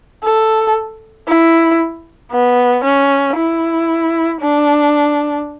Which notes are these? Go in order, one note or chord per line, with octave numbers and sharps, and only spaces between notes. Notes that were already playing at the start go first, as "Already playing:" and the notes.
A4
E4
B3
C#4
E4
D4